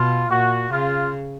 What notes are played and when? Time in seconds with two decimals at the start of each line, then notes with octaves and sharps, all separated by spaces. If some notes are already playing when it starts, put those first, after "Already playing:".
Already playing: B2 F4
0.30 A#2 F#4
0.71 C#3 F4